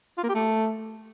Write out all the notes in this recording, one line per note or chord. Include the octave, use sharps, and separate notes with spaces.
F4
A#3
G4
A3